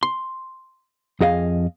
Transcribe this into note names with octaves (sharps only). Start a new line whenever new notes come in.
C6
F2 G#4 D#5 F5